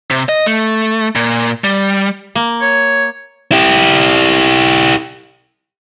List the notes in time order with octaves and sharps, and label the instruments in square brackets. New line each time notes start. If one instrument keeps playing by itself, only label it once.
[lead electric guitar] C3
D#5
A3
A#2
G3
[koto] A#3
[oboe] C#5
[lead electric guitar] E4 G4